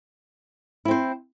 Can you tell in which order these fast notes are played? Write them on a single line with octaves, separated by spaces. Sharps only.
E4 C4 C5